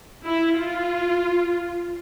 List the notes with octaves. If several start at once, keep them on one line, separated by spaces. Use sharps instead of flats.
E4
F4